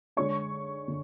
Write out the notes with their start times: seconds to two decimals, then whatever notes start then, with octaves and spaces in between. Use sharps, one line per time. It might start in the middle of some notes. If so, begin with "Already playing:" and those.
0.17 D3 G#3 D4 C#5 C#6
0.88 D3